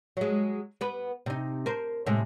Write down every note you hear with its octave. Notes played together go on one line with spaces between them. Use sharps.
F#3 G#3
B3 B4
C3 D#4
A#4 C5
A2 C3 G#3